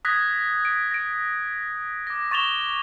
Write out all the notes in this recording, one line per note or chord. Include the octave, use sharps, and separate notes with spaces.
D#6 F#6 G#6 A#6 B6
D7
A#6 D7
D6 A#6
C#6 A6 E7 F7 G7